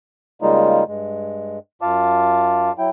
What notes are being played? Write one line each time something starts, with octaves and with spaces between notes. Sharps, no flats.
C#3 G3 G#3 A#3 D#4 F4
G2 G#3
F#2 F4 F5 A5 D6
F#3 E4 G5